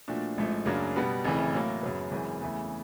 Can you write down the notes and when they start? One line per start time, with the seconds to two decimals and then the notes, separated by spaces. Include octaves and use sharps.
0.08 A#2 F3 A3 D4 F#4
0.37 A1 G#2 F3 A3
0.66 F#2 C#3 F#3 A#3 D4
0.96 B2 G3 B3
1.25 F1 F2 C#3 E3
1.53 A2 F#3 A#3
1.82 F#2 C#3 F#3 B3
2.11 G#1 F#2 C#3 E3
2.41 E2 C#3 E3 A3